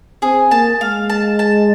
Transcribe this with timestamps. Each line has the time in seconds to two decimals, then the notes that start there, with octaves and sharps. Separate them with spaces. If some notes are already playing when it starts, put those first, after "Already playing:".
0.22 C4 G#4
0.51 A#3 A5
0.81 G#3 F5
1.10 A5
1.39 A5